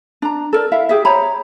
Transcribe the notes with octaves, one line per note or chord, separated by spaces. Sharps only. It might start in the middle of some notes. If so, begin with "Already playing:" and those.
D4 A#5
A4 A#4 D5
E4 E5 F5
G4 G#4 E5
C5 C#5 A#5 B5